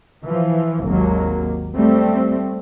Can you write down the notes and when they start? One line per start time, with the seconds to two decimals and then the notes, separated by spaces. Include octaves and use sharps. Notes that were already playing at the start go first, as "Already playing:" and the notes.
0.24 E3 F3
0.84 G#1 D#2 F#3 A#3
1.76 G3 A3 C4